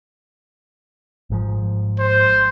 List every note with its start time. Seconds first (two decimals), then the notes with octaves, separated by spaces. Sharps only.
1.30 G#1 G#2 F3
1.99 C5